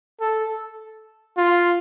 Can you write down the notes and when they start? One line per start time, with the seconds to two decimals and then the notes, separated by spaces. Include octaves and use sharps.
0.21 A4
1.37 F4